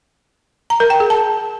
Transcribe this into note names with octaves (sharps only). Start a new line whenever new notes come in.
A#5
A#4
G5
G#4
A5